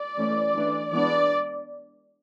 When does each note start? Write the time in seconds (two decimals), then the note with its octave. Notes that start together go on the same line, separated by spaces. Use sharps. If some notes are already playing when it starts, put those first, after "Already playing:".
Already playing: D5
0.18 E3 A3 C#4
0.55 E3 A3 D4
0.92 E3 G#3 B3 D4 D5